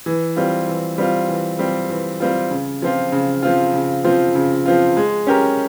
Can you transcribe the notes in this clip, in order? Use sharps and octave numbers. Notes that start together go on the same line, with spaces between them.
E3
G3 C4 F4
E3
G3 C4 F4
E3
G3 C4 F4
E3
G3 C4 F4
C#3
F3 C4 F4
C#3
F3 C4 F4
C#3
F3 C4 F4
C#3
F3 C4 F4
G#3
C#4 G4 A#4